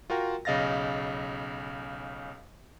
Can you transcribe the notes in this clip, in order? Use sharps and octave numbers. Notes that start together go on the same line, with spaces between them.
F4 F#4 A#4 G5
B1 C#3 D#5 F5 A6 A#6